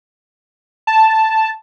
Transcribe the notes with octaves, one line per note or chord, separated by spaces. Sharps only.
A5